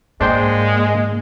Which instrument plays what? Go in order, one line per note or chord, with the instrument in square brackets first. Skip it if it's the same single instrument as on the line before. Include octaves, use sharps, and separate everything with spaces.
[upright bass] G#2 [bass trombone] G#3 [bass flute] A#3 [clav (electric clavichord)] D4 C5 G5